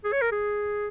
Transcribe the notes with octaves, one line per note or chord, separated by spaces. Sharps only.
G#4
C#5
A#4
G#4